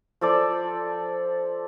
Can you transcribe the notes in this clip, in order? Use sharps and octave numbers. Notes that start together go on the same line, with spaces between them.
F3 A4 D5